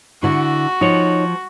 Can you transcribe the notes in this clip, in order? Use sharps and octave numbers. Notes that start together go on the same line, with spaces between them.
D3 E4 F#4
F3 D#4 C#5